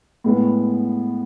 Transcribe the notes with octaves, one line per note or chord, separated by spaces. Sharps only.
A2 G#3 B3